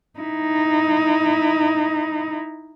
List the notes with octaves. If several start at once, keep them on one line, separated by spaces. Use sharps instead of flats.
D#4 E4